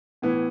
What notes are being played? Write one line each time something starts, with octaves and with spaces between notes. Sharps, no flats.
A2 E3 B3